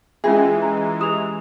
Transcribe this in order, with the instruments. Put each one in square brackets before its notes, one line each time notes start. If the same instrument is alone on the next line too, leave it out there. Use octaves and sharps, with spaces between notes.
[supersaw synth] E3 G#3 [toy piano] C#4 F4 E5 [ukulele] G#4
[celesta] A#5
[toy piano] G4 A#5 E6 [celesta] D#6 F7